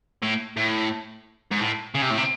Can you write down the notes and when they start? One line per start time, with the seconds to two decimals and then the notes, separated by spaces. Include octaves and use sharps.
0.23 A2
0.57 A2
1.51 G#2
1.60 A2
1.95 C#3
2.02 C3
2.10 A2
2.17 C3